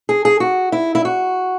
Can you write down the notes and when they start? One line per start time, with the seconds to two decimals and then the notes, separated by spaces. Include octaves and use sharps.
0.09 G#4
0.25 G#4
0.40 F#4
0.72 E4
0.95 E4
1.05 F#4